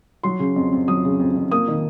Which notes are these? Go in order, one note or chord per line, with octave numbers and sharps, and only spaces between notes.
F#3 C6
C#3
F2
F2
F#3 D#6
C#3
F2
F2
A#3 D#6
D#3